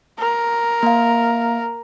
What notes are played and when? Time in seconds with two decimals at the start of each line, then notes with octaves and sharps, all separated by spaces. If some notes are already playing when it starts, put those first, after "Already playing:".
0.19 A#4
0.83 A#3 F5